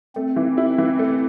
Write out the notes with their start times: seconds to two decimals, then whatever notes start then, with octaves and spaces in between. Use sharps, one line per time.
0.16 A3 C4
0.36 E3
0.58 E4
0.78 E3
0.99 A3